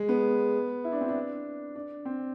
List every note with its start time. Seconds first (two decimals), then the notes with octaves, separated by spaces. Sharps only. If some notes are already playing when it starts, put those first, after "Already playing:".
Already playing: G#3
0.09 B3
0.84 E4
0.92 D4
1.01 C4
1.09 D4
1.75 D4
2.05 C4